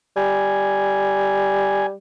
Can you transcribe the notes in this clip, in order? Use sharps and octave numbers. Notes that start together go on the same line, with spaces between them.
G3 G#5